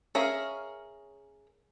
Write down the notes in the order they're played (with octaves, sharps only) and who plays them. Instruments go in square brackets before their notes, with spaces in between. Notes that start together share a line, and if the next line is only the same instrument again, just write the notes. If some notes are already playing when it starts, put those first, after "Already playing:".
[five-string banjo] C#4 G#4 A#4 E5 F5